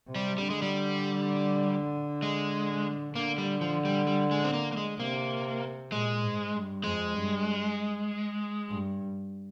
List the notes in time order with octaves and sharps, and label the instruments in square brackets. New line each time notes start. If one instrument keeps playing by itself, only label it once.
[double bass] C3
[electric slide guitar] G3
[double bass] D3 [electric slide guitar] G3
[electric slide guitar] G#3
G3
G#3
[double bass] D3 [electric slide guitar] A#3
[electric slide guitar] G3
F3
G3
G3
G#3
C4
A#3
A#3
G#3
[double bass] C3 [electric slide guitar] A#3
[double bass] A#2 [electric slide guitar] G#3
[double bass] G#2
G2
[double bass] F2 [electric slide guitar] G#3
[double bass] G2
G2